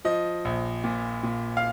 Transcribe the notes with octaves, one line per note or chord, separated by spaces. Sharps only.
F3 D#5
A#1
A#2
A#2
F5